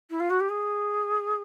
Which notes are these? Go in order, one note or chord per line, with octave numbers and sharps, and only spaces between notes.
E4
F4
F#4
G4
G#4